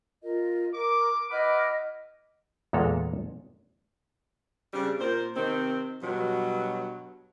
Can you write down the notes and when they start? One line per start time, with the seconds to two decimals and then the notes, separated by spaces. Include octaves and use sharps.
0.23 F4 A#4 D#5
0.74 A#4 D6
1.30 E4 B4 D#5 F#5 D6 F6
2.73 E2 A#2 G#3 A4 A#5
4.73 C#3 G3 C4 D4
5.00 A#2 A#4 C5
5.35 C3 D#3 C4
6.02 G2 B2 F#3